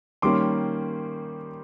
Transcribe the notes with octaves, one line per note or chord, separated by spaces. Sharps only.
D#3 G3 A#3 C#4 C6 D6